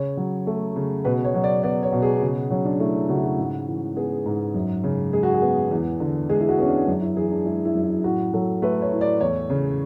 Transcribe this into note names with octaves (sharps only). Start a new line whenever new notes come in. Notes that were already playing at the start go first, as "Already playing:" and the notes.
Already playing: C#3 C#5
F#3
A3
C#3
B2 B4
C#5
F#3
D5
B3 D5
C#5
B2
G#4
C#3 F#4
F#3 C#4
D4
A3 E4
C#3 F#4
E4
F#4
G#2
E3
B3 G#4
G#2
F#2
C#3
G#3 G#4
F#4
G#4
B3
E2
D3
G#3 G#4
E4
F#4
B3 C#4
D4
F#2 D4
E4
E3 G#4
D4
G#3 E4
E4
F#2
E4
A2 F#4
F#3 A4
A3 B4
C#5
A2
D5
E2 C#5
C#3